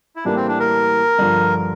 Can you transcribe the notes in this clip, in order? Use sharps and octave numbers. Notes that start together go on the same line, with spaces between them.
E4
A2 E3 G3 A#3 D4
C4
D4
A#4
G2 D3 F3